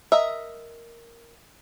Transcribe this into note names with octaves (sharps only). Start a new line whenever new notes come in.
A#4 D#5 E5